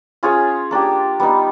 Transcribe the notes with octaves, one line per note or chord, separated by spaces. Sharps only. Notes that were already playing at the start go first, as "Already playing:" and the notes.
C#4 F4 G#4 C#5
A#3 D4 G4
G3 B3 D#4